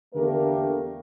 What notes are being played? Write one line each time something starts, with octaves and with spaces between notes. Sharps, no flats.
E2 D3 A3 A#3 G4 A#4